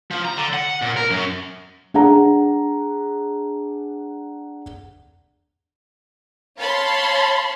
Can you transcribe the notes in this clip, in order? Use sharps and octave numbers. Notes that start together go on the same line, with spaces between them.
F3
A#5
D3
F#5
A#2
A#4
F#2
D4 G#4 F#5 A#5
C#5 F5 A5 B5 C6